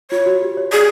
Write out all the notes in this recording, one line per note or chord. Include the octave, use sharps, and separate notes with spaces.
F4 C#5
F#4
G4
C#5
G#4 D5